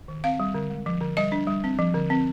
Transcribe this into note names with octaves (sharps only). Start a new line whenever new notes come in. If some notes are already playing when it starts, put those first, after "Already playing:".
D#3
C4 F5
G3
D3
G#3
F3
D3
G3 D#5
D4
G3
C4
F3
D3
C4